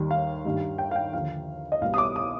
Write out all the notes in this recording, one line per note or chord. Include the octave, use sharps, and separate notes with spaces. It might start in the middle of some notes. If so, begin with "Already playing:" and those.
Already playing: D#2 D#3 G3
F5
G2 D#3 G3
G5
F5
G5
D#2 D3 F3 F5
D#5
C2 B2 G3 F5
D#6
D6
D#6